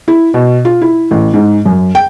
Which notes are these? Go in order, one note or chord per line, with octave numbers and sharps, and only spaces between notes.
E4
B2
F4
E4
A1
G#2
F#2
G5